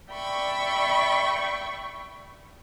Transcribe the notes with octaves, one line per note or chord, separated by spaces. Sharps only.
D5 E5 G5 B5 C#6